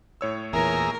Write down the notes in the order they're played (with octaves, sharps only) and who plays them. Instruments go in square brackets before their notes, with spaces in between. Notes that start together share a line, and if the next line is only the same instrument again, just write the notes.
[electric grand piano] A2 C#5 E6
[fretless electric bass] E2 A#2 E3 [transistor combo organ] G#4 E5 A#5 [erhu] A#4